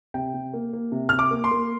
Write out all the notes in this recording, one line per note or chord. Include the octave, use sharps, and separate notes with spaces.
C3 G5
C3
A#3
A#3
C3
C3 F6
D6
A#3
C6
A#3